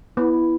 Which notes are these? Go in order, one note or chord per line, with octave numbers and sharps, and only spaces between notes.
B3 E4